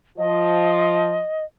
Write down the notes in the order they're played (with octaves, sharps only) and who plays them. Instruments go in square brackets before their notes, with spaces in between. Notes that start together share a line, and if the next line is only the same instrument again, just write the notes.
[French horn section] F3 [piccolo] D#5